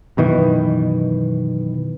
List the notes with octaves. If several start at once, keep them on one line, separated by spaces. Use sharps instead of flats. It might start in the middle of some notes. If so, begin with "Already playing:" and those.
F#2 B2 D#3 E3